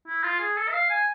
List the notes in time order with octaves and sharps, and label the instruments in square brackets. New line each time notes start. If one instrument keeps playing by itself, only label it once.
[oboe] E4
F4
G#4
A4
E5
F5
G#5